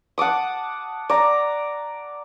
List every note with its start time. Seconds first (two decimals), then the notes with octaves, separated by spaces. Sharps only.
0.18 F#5 A5 D6 D#6
1.09 D5 A#5